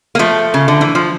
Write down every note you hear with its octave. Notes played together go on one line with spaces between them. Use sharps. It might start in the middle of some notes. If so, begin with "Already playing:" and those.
A#3
F3 A3
C#3
D3
E3
F3